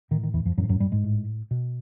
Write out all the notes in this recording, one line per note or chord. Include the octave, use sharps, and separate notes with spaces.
A2 D#3
D#3
E2 E3
F2 F3
F#2 A2 F#3
F3
F#2 F#3
G2 G3
G#2 G#3
A2
B2